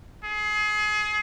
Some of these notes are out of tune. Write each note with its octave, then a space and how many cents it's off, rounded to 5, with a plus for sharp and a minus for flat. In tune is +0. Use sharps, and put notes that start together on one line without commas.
G#4 +30